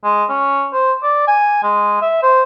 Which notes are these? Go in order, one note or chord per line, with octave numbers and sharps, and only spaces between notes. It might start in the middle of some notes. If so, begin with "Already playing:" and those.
G#3
C#4
C5
D5
G#5
G#3
E5
C5